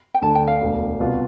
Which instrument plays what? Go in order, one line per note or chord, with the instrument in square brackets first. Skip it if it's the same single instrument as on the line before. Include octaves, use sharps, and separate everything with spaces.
[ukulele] G5
[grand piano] D2 D3 A3 D4 [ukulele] A5
[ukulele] G5
F5
[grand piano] E1 D2 D3
C2 B2 B3 F4